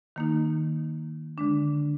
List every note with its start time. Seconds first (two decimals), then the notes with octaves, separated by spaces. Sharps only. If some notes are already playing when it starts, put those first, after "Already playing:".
0.16 D#3 A#3 D#4
1.38 D3 G#3 D4